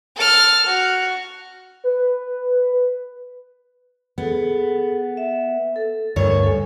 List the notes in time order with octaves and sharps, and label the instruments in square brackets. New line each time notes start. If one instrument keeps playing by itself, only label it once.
[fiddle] A4 F6
F#4
[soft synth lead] B4
[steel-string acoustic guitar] B3 [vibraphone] G#4 A4
[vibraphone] E5
A4
[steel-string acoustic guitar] D2 G2 C#5 [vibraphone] A#4
[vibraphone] A4 G#5